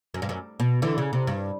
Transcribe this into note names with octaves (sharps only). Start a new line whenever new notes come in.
F#2
G2
F#2
B2
D3 E3
C#3
C3
G2